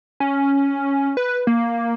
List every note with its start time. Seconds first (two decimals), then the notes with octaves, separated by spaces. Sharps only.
0.20 C#4
1.17 B4
1.47 A#3